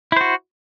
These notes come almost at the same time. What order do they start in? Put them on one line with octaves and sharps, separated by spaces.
E4 C5 F#4